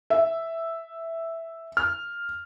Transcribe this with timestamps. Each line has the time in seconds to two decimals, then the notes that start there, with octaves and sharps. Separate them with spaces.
0.10 E5
1.77 F6